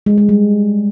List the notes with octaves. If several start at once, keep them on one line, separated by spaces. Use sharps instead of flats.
G#3
G#3
G3